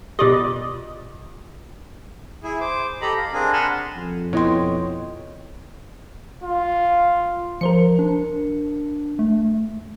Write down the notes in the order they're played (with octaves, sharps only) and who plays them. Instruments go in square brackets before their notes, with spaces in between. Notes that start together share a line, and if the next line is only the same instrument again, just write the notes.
[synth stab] B2 D5 D#5 [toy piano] F4 G4
[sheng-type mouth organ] E4 G#4
C5 D6
G4 A4 D#5 A#5 B5
F5
C4 D4 G#4 A#4
F#5 G#5 A5 B5 C6 F6
[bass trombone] F2
[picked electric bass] B2 B3 [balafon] E4 C6 [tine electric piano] C#5 D#5 G5
[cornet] F4
[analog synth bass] F3 [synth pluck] A#4 C5 C#7
[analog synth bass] D4
A3